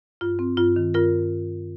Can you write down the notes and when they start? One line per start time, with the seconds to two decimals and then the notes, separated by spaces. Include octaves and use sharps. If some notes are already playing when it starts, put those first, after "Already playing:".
0.21 G2 F4
0.39 C4
0.57 G2 F4
0.76 D#3
0.94 G2 F4 A#4